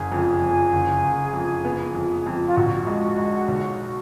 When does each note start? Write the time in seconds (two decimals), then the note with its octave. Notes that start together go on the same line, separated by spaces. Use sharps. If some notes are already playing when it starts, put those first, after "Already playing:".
Already playing: F#1 G#4
0.12 F2
0.42 F2
0.73 F#1
1.04 F#1
1.33 F2
1.65 B3
1.95 F2
2.26 F2
2.46 F4
2.56 A#1 F#4
2.87 G#3
3.18 G#3
3.48 B1